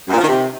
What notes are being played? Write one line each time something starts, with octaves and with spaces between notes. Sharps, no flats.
F#2
A#2
F3
D#3
C3